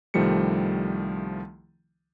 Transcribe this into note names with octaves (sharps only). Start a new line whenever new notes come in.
C2 D#3 F3 G3 A3 C#7